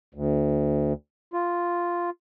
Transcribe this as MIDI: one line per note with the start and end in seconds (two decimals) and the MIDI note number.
0.14 0.93 38
1.34 2.10 65